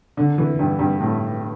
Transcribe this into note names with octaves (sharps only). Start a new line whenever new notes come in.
D3
E3
G2
G2
A2